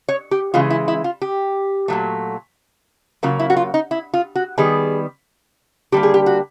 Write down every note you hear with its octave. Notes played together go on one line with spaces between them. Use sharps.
C#5
G4
C#3 E3 G#3 F4
E4
E4
F4
G4
A#2 F#3 A3
C#3 F#3 A#3 F4
E4
F#4
F4
D#4
E4
F4
F#4
D#3 G3 B3 G#4
D3 G3 A#3 G4
G#4
G4
F#4